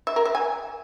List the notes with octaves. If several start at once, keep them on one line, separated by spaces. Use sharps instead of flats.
E5
A#4
E5
G#5